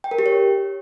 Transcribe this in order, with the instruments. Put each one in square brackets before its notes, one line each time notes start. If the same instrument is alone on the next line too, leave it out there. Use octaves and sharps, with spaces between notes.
[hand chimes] G5
A#4
G4
C#5